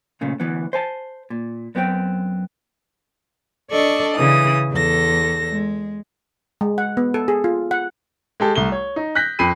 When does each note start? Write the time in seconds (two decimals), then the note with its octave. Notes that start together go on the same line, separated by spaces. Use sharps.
0.21 A#2 C#3 A3
0.40 D2 E3 B3
0.73 C5 G#5 A5
1.30 A#2
1.75 F#2 B3 C4 F#4 G5
3.71 D4 A4 D5 D#5 C#6
4.15 C#3 E3 D#6
4.71 E2 A4 A#6
5.50 G#3
6.61 G#3
6.78 F#5
6.97 B3
7.14 A4
7.28 G#4
7.44 F4
7.71 F#5
8.40 G#3 G4 A4
8.55 C2 A3 G7
8.72 C#5
8.96 D#4
9.15 F#6 G6 A#6 B6
9.39 F2 B5 C7 D#7